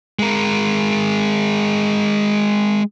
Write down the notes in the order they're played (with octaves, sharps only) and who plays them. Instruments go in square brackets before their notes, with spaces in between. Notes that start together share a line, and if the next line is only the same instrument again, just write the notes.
[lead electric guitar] G#3 A#4